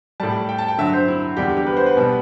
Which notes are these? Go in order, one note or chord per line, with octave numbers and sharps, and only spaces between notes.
A2 G3 A5
G5
A5
G5
G2 D3 F#3 E5
C5
E4
E2 D3 G3 G4
G4
B4
C5
B4
B2 G3